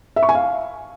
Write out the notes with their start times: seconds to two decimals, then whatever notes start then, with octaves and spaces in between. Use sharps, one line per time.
0.16 E5
0.23 C#6
0.29 G#5
0.35 F5